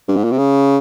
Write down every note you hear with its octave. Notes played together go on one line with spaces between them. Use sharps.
G2
G#2
A#2
C3
C#3